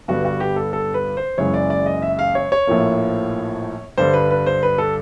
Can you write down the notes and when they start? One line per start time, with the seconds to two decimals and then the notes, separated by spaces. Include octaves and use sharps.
0.08 G2 D3 G3 B3 F#4
0.25 F#4
0.40 G4
0.56 A4
0.73 A4
0.94 B4
1.17 C5
1.38 F#1 F#2 C#3 E3 G#3 C#5
1.54 D5
1.70 D5
1.86 D#5
2.02 E5
2.19 F5
2.35 C#5
2.52 C#5
2.67 A#1 A2 F3 A#3
3.97 G2 D3 G3 C5
4.14 B4
4.31 B4
4.46 C5
4.63 B4
4.78 A4